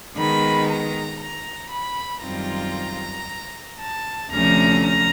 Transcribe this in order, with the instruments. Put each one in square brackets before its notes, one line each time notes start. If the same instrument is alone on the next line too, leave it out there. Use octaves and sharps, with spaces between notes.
[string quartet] D#3 G#3 B3 B5
A#5
A#5
B5
F#2 D#3 G3 C4 F4 A#5
A5
D2 C3 F3 A3 C#4 A#5
A#5